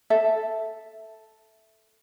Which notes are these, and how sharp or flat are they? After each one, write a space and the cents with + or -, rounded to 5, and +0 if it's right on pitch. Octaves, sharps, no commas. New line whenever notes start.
A4 +0 E5 +0